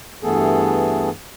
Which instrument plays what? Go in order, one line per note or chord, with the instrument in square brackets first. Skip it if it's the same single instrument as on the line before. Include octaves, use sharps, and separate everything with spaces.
[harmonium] G2 E3 A3 B3 G#4 A4